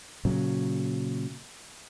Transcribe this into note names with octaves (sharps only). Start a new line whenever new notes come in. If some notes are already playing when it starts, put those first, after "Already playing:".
A#2 C#3 F#3